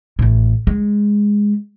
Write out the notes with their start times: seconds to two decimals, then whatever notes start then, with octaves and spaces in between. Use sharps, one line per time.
0.19 A1 A2
0.67 G#3